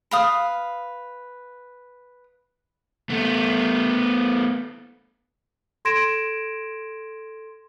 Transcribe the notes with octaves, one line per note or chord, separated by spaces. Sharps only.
B4 F5 D#6
A3 B3
A4 C6 G#6 A#6 D7 E7